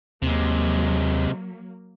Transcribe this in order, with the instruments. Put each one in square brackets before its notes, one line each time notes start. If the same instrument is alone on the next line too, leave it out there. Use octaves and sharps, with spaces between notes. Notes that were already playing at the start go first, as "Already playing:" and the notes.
[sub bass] D#2 [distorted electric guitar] C3 G#3 [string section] F#3 A#3